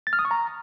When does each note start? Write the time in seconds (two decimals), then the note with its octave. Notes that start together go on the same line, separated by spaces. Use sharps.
0.07 A6
0.13 F6
0.19 D#6
0.25 C#6
0.31 A#5